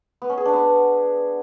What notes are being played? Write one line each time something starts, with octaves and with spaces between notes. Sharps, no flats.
B3
C#4
G#4
D4
B3